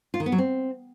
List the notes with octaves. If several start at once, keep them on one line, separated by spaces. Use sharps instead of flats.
F4
D#3
B3
F#3
C4